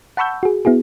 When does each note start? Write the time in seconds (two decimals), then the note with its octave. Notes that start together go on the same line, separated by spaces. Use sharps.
0.17 F#5 A5 B5 C#6 E6 G6
0.43 F#4 G#4
0.65 B3 E4 F#4 G#4